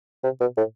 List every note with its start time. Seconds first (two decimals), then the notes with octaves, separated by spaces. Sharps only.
0.24 C3
0.41 B2
0.57 A2